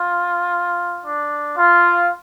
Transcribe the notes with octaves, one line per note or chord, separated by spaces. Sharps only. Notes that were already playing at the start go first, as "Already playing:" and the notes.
Already playing: F4
D4
F4